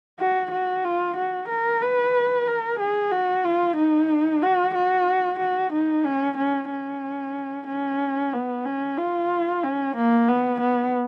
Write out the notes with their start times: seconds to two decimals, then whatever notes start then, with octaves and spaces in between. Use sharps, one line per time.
0.19 F#4
0.51 F#4
0.84 F4
1.16 F#4
1.48 A#4
1.81 B4
2.47 A#4
2.79 G#4
3.11 F#4
3.44 F4
3.77 D#4
4.42 F#4
4.74 F#4
5.39 F#4
5.72 D#4
6.05 C#4
6.37 C#4
6.70 C#4
7.67 C#4
8.33 B3
8.65 C#4
8.98 F4
9.63 C#4
9.96 A#3
10.28 B3
10.60 B3